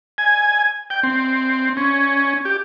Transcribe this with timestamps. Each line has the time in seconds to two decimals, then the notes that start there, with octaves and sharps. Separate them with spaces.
0.18 G#5
0.90 G5
1.03 C4
1.77 C#4
2.45 G4